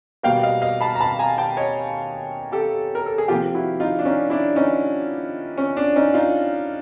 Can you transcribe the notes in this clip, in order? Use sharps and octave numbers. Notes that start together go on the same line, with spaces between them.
B2 G3 A#3 F5 G5
D#5 F5
D#5 F5
A5 B5
A#5
A5 B5
G#5 A#5
G5 A5
C#5 D#5
G4 A4
A#4
A4
G#4
C3 F3 A#3 F4 G4
E4 F#4
D#4 F4
D4
C#4 D#4
D4 E4
C#4 D#4
C#4
D4
C#4 D#4
D#4 F4